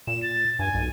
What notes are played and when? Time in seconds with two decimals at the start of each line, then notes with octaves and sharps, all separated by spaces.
0.07 A#2 E7
0.23 A6
0.59 G2 G#5
0.74 B1